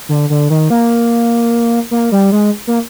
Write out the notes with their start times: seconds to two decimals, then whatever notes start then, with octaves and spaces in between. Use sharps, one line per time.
0.09 D3
0.30 D3
0.50 D#3
0.70 A#3
1.91 A#3
2.12 G3
2.32 G#3
2.67 A#3